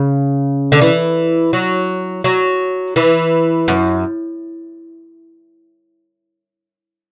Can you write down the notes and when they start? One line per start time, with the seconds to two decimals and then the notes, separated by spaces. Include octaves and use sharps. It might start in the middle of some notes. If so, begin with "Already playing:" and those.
Already playing: C#3
0.72 D3
0.81 E3
1.53 F#3
2.24 F#3
2.96 E3
3.68 F#2